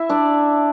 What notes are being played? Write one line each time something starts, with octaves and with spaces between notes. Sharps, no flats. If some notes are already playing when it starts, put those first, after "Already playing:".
Already playing: E4 E5
D4 D5